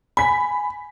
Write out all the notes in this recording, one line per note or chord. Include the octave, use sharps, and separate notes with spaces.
G#5 B5 B6